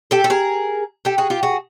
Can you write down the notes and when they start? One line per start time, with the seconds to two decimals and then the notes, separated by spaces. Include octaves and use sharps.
0.11 G4 A4
0.24 A4
0.30 G#4 A#4
1.05 G4 A4
1.18 F#4 G#4
1.30 F4 G4
1.43 F#4 G#4